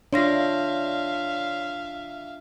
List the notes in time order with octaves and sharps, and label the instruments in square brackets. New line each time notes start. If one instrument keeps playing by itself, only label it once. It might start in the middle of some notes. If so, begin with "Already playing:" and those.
[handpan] D4 F4 [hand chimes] C#5 C6 A#6 [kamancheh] E5 F5